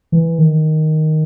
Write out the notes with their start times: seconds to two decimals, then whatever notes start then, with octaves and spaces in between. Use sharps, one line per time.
0.12 E3
0.38 D#3